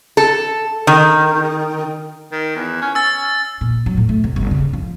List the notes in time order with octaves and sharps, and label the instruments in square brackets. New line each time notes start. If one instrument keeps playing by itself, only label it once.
[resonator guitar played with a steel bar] A4
D#3
[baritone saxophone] D#3
E2
C#4
[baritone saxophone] C#4 [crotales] E6 A6
[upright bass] A#2
F#3
A2
A3
C3
G1
C#3
F3